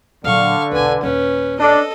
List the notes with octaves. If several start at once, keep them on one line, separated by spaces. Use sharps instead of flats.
A#2 D3 F#3 F5 C#6
B1 E2 B4 G#5
A#1 D#2 C#4 B4
D4 A4 D#5